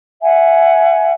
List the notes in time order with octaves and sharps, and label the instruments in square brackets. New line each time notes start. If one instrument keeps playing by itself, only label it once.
[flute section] E5 F#5 G#5